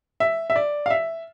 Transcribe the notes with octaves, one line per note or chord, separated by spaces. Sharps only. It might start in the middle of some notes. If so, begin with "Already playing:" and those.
E5
E5
D5
F5
E5